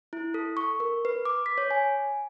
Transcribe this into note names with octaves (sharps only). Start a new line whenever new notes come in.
E4
A4
C#6
A#4
B4
D6
B6
C#5
G#5